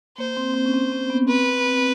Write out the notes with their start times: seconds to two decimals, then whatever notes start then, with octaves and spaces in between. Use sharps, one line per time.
0.17 A#3 C5
0.37 C4
0.54 C4
0.66 C#4
0.74 C4
0.92 C4
1.10 B3
1.28 C4 B4